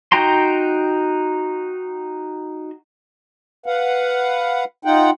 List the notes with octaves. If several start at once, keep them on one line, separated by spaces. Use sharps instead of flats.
D#4 F#4 G5 A#5 C6
B4 F5 F#5
D#4 F4 F#5 G5